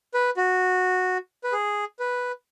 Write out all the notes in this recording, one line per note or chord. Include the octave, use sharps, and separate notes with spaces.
B4
F#4
B4
G#4
B4